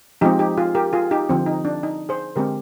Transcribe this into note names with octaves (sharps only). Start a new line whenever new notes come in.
F3 G#3 C4 D#4 G4
D#4 G4
F4 G#4
G4 A#4
F4 G#4
D#4 G4
D3 F3 C4
D#4
D4
D#4
G#4 C5
D3 G#3 C4 G4 A#4